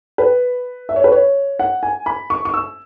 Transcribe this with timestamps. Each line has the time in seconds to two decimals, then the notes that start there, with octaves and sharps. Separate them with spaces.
0.18 B4
0.89 E5
0.96 C#5
1.04 B4
1.12 C#5
1.59 F#5
1.83 G#5
2.06 B5
2.30 C#6
2.45 C#6
2.54 E6